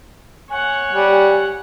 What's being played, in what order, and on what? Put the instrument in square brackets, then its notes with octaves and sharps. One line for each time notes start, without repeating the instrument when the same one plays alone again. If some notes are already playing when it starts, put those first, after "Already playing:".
[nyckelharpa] C#5 F#5 [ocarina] G#5
[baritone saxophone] G3